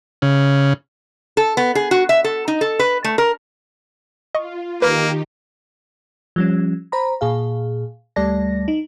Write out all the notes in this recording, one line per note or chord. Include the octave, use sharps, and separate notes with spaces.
C#3
A4
B3
G#4
F#4
E5
A4
D#4
A4
B4
A3
A#4
F4 D#5 C#6
D#3 A#3 D#4 G4 B4
F3 G3 C#4
C5 A#5 B5
A#2 G#4 F5
D2 G3 A3 D5 A5 A#6
D#4